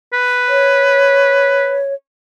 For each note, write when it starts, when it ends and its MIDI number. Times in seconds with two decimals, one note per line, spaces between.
0.13 1.80 71
0.49 1.94 73